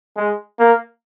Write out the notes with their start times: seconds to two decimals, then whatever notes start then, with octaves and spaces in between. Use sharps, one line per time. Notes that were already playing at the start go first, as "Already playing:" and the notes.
0.17 G#3
0.59 A#3